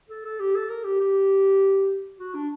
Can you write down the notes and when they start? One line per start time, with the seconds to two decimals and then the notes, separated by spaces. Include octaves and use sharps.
0.09 A4
0.25 A4
0.40 G4
0.55 A4
0.69 A#4
0.84 G4
1.00 G4
2.19 F#4
2.34 D4